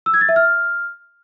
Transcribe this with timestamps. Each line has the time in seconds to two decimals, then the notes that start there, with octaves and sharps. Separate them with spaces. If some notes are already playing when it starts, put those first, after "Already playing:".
0.06 E6
0.14 G#6
0.21 A6
0.29 E5
0.36 F6